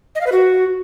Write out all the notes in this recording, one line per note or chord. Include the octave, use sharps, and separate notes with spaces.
D#5
F5
B4
F#4